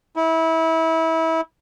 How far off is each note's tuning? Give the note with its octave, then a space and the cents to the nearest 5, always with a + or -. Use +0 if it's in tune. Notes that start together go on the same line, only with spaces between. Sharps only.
E4 -25